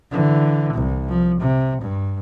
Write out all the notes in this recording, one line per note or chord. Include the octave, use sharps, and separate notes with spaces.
D3 E3
C2
F3
C3
G2